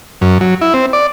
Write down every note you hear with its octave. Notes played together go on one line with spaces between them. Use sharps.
F#2
F#3
E4
C4
D5